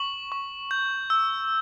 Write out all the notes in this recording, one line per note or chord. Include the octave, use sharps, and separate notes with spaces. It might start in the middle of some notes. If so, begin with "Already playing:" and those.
Already playing: C#6 F#7
C#6
G6
E6